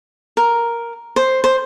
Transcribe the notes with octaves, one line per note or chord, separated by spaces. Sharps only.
A#4
C5
C5